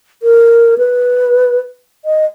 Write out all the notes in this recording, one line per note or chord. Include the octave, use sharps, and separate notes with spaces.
A#4
B4
D#5